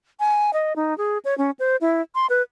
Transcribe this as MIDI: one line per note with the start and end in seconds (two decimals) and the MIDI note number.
0.20 0.51 80
0.53 0.76 75
0.76 0.97 63
0.98 1.18 68
1.25 1.37 73
1.38 1.51 61
1.59 1.76 72
1.81 2.02 64
2.15 2.27 84
2.30 2.42 71